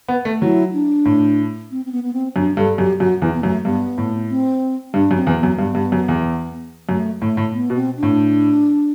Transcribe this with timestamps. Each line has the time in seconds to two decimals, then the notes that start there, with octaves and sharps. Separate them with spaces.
0.08 B3
0.25 A3
0.41 F#3 E4
0.73 D4
1.05 A2
1.71 C4
1.85 C4
1.92 B3
2.04 B3
2.13 C4
2.36 F#2 D4
2.57 G2 A4
2.78 F#2 G4
3.00 F#2 F#4
3.22 E2 E4
3.33 B3
3.43 F#2 A3
3.65 G2 B3
3.98 A2
4.30 C4
4.94 G2 D4
5.11 F#2
5.16 C4
5.27 E2
5.38 B3
5.43 F#2
5.59 G2 B3
5.75 G2
5.92 F#2
6.08 E2
6.89 F#2 A3
7.21 A2 A3
7.37 A2
7.54 B3
7.70 B2
7.75 C4
7.97 D4
8.03 A2